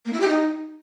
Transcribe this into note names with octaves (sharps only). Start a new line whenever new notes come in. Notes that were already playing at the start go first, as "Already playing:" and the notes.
A#3
E4
G4
D#4